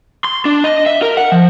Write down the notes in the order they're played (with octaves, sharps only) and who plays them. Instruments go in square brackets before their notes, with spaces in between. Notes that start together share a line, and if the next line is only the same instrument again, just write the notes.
[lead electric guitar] C6
D4
D#5
E5
A#4
F#5
F3